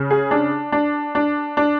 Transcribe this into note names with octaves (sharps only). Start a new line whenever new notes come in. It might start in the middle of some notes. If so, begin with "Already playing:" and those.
Already playing: C#3
G#4
D4
D4
D4
D4